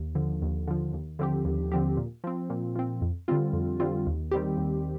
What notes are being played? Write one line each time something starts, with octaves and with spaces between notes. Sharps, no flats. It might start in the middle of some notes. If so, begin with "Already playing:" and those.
Already playing: D#2
D3 F3
D#2
D3 F3
D#2
D3 F3 C4 G4
D#2
D3 F3 C4 G4
A#2
F3 C4
A#2
F3 C4
F2
D3 G3 C4 F4
F2
D3 G3 C4 F4
D#2
D#3 G3 C4 G4
D#2